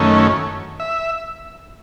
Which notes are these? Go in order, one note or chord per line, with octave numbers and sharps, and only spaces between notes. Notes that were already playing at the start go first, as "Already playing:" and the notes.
Already playing: F#2 D#3 A3 C#4
E5